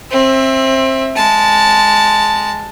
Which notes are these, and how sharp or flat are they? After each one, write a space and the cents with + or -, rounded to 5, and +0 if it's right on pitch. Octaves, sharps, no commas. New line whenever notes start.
C4 +25 E5 +0
G#3 +0 A5 +0